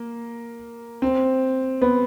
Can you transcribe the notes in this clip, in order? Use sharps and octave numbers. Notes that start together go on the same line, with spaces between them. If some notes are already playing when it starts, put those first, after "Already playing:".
Already playing: A#3
C4
B3